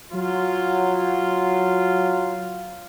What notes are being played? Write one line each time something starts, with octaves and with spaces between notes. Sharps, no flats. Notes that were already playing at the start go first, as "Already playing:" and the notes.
F#3 F4